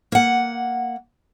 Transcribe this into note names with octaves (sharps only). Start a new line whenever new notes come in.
A#3 F#5